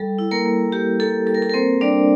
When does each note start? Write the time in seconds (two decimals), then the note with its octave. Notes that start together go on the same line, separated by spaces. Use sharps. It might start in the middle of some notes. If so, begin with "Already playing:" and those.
Already playing: G3 A4
0.19 E4
0.31 A#3 A#4
0.46 A#3
0.72 A#3 G4
0.99 A#3 A4
1.27 G3 A4
1.34 A#4
1.42 A4
1.50 A#4
1.54 A#3 C4 C5
1.81 G3 D4 D5